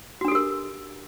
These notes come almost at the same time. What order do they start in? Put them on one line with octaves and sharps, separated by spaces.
F#4 D4 A4 G4 A#4